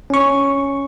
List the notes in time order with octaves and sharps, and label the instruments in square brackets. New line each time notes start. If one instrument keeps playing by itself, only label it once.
[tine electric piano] C#4 C#6